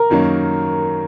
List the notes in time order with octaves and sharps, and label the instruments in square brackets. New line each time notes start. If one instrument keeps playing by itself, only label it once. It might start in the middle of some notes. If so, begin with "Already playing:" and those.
Already playing: [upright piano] A#4
[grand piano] F#2 D#3 F#3 A#3 C#4